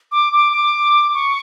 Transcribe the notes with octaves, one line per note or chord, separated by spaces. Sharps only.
D6
D6
D6
C#6